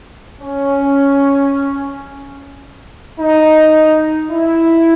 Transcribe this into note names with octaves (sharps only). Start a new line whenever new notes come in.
C#4
D#4
E4